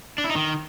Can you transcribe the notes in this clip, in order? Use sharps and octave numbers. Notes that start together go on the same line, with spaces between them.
D4
E4
D#4
D#3